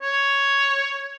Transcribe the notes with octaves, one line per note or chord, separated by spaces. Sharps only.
C#5